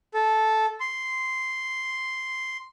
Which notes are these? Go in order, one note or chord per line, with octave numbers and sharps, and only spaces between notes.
A4
C6